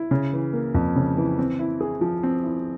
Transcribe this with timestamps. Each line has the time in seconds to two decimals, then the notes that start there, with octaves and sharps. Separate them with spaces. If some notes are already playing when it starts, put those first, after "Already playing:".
Already playing: E4
0.11 C#3
0.33 E3
0.53 A#3
0.74 F2
0.96 C#3
1.17 E3
1.39 C4
1.59 E4
1.81 G#4
2.01 F3
2.23 C4
2.44 E4